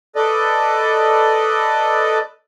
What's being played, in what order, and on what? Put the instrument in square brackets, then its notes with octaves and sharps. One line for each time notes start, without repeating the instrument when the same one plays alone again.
[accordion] A4 B4 D5 D#5